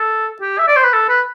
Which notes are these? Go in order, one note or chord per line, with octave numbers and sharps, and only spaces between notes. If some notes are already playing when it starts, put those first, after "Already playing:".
Already playing: A4
G4
E5
D5
C5
B4
A4
B4